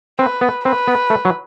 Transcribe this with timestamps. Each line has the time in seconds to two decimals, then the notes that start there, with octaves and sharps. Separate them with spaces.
0.19 C4 B4
0.41 B3
0.65 C4 B4
0.88 B3
1.10 A3
1.25 F#3